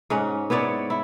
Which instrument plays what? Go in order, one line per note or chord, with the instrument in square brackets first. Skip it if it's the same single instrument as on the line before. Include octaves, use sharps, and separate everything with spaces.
[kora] G#2 C#4 F#5
B3 E4 C#5 D5
E4